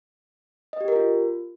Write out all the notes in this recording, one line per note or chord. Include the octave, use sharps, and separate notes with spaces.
D#5
G4
A#4
F4